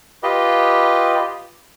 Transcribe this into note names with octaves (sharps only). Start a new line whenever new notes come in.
F4 G4 B4 D#5